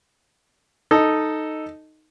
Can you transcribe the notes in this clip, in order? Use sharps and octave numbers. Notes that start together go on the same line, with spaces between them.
D#4 A4 D#5